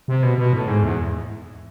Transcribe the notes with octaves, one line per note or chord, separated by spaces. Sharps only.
C3
B2
B2
A2
G#2
E2